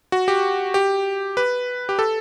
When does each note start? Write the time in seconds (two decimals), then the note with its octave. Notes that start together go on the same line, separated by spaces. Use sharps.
0.12 F#4
0.28 G4
0.74 G4
1.37 B4
1.89 G4
1.99 A4